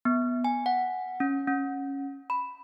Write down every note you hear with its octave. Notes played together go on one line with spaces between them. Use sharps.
B3
G#5
F#5
C#4
C#4
B5